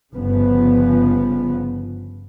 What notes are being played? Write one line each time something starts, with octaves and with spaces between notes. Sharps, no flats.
G1 C#3 F3 B3